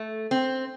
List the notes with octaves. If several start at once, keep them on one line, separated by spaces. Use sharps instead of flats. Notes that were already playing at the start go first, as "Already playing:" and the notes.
Already playing: A3
C4